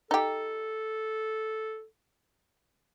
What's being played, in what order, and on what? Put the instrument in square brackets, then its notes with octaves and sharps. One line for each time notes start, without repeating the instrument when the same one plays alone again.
[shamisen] D#4 G4 [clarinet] A4